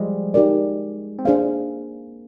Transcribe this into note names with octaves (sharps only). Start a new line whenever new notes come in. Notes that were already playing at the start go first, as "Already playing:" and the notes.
Already playing: F3 G3 G#3
D#4 G4 A#4 D5
C4
A#3 D4 G#4 C5 F5